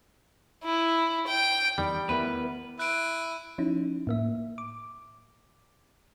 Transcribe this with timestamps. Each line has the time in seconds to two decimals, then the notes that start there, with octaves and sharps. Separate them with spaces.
0.64 E4
1.27 G5
1.78 E2 D#3 G3 D#5
2.09 B3 E4 A#4 B4
2.79 E4 F#6 D7 D#7
3.58 F3 C#4 D#4 E4
4.07 A2 A#3 E5
4.58 D6